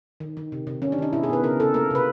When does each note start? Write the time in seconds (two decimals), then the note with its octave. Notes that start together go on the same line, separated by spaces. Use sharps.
0.20 D#3
0.37 D#3
0.52 C3
0.67 C3
0.82 D#3 C#4
0.92 D4
0.98 D#3 D#4
1.13 B2 E4
1.23 G#4
1.29 B2 B4
1.43 C#3 A#4
1.60 C#3 A4
1.74 A#3 A#4
1.91 C3 B4